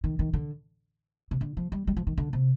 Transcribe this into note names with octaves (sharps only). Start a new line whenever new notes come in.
D#3
D#3
D3
C3
D3
F3
G3
G3
F3
D#3
D3
C3